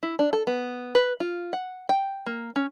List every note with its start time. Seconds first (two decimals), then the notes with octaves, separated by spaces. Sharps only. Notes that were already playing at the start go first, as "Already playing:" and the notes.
0.03 E4
0.19 D4
0.33 A4
0.47 B3
0.95 B4
1.20 F4
1.53 F#5
1.89 G5
2.26 A#3
2.56 C#4